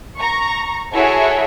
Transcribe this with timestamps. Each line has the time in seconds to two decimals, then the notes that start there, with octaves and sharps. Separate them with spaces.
0.18 A#5 C#6
0.92 E4 F#4 G#4 A4 C#5 E5